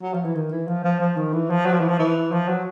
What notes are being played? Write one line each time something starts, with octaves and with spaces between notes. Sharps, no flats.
F#3
F3
E3
D#3
E3
F3
F3
F3
D#3
E3
F3
F#3
F3
E3
F3
E3
F3
F#3